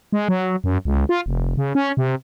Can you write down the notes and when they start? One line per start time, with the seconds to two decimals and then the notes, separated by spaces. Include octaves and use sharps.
0.12 G#3
0.28 F#3
0.64 F#2
0.85 C#2
1.09 F4
1.26 F1
1.57 C#3
1.75 C#4
1.97 C3